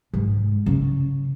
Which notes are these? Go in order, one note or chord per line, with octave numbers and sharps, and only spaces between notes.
G#2
C#3